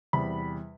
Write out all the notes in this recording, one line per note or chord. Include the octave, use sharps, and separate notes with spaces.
E2 C3 G3 B5